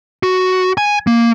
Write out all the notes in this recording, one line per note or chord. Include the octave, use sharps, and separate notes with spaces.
F#4
G#5
A#3